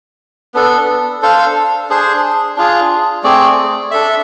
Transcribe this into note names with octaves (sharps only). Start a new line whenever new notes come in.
B3 D4 A4
D4 A4 C5 F5
D4 G#4 C5
D4 F4 G#4
A3 C4 G#4 D5
D4 A4 E5